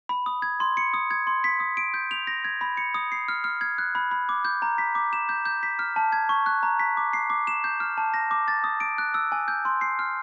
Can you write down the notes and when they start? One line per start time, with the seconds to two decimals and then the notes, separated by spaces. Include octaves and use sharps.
0.09 B5
0.26 D#6
0.42 G#6
0.60 C6
0.77 C#7
0.94 D#6
1.11 G#6
1.27 C6
1.44 B6
1.60 D#6
1.77 D7
1.94 G6
2.11 F7
2.27 A#6
2.44 G#6
2.61 B5
2.77 C#7
2.94 D#6
3.12 C7
3.28 F6
3.44 F6
3.61 G#6
3.78 F#6
3.95 B5
4.11 B5
4.29 D6
4.45 G6
4.62 A#5
4.78 B6
4.95 D6
5.13 E7
5.29 G6
5.45 G6
5.63 B6
5.79 F6
5.96 A5
6.12 G#6
6.29 C#6
6.46 F#6
6.63 A#5
6.80 B6
6.97 D6
7.13 C7
7.30 D6
7.47 E7
7.64 G6
7.80 F6
7.98 A5
8.14 A#6
8.31 D6
8.48 A6
8.64 D#6
8.80 D7
8.98 F#6
9.14 E6
9.32 G#5
9.48 G6
9.65 C6
9.81 C7
9.99 F6